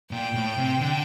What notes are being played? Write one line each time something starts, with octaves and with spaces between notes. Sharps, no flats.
A#2 G5
A2
C3
D3